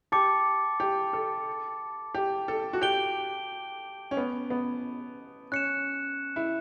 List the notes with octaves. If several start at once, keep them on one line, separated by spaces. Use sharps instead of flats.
G4 A5 D6 A6 C#7
G4
A4
G4
A4
F#4
G4 G6 D7 G7
C#4
B3
B3
C#4 F#6 C#7 E7
E4